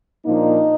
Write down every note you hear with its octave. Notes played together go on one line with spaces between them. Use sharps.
A#2 F3 A#3 D4 D#4